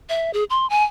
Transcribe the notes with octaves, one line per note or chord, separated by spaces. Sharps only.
E5
G#4
C6
G#5